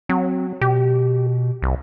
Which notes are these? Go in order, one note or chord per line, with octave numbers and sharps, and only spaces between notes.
F#3 C4
B2 G4
C2